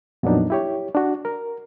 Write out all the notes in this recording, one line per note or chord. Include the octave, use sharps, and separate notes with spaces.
F2 A#2 F#3 B3 D4 D#4
E4 G4 C#5
D4 F#4
A#4